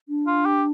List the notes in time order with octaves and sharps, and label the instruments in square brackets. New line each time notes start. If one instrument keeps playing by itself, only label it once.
[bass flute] D4
[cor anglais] F4
G4